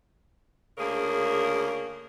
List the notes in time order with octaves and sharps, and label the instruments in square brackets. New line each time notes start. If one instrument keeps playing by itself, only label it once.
[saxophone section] D2 C#3 A#3 G#4 A#4